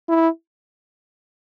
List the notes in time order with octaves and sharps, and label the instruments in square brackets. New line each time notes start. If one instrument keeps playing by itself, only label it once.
[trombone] E4